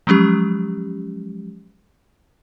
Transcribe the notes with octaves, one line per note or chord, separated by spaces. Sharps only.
F3 F#3 G#3 C#4 G4